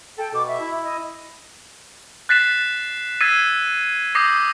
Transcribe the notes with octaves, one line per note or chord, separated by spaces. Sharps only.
A4 G5
B2 D6
E5
E4
D#5
F#6 A6 B6 C7 E7
E6 G#6 A6 B6 C7 D#7
D6 D#6 G6 A#6 C7